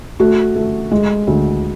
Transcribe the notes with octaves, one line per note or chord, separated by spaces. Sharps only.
A3 F#4
A3
G#3
D2